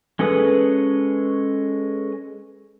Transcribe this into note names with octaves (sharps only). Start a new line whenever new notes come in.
G#3 C#4 A4 B4 D#6